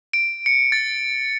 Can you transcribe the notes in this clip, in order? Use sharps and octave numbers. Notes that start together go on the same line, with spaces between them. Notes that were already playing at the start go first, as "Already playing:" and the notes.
D7
C#7
A6